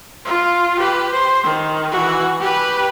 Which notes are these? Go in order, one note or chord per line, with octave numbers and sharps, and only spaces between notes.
F4
G4 B4
C5
D#3
E3 F#4
G4 B4